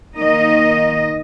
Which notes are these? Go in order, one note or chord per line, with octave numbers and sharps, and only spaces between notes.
D#3 A#3 D#4 D#5